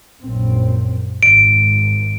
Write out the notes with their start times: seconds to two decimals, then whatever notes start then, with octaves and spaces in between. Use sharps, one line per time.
0.23 A#1 F#2 C4
1.23 G#1 D7